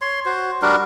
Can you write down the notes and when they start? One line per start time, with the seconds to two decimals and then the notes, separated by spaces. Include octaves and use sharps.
0.01 C#5 C6
0.26 F#4 C5
0.62 G3 D4 F#4 A#4